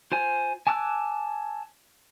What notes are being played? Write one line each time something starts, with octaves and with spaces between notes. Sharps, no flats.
F4 C5 G#5
G#5 A5 D6 E6 F#6